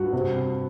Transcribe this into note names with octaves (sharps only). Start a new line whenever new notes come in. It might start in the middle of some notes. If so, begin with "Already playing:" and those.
Already playing: G2 F#4
C3